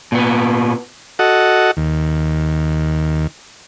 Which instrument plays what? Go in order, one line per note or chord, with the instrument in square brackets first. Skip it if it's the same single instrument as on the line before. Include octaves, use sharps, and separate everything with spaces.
[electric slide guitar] A#2 B3
[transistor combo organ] F#4 A4 D#5 F#5
D#2